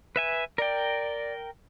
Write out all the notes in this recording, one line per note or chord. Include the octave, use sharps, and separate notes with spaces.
B4 E5 G#5
A#4 D5 G5